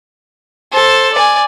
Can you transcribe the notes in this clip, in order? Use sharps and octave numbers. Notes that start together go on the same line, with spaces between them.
A4 C5
D5 G#5